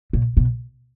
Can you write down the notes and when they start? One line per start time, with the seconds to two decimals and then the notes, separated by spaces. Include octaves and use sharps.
0.13 A#2
0.37 B2